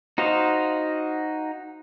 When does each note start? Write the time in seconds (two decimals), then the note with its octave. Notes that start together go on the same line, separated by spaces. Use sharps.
0.18 D#4 F#4 C5 D#5 F5